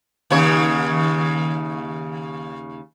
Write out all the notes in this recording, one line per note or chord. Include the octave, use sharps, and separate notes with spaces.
D#2 C#3 C#5